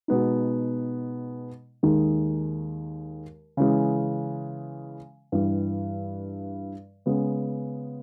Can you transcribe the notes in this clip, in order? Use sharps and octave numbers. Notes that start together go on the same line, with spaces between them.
B2 G#3 B3 D#4
D#2 D#3 G#3 D#4
C#3 E3 G#3
G2 E3 G3
C#3 G#3 B3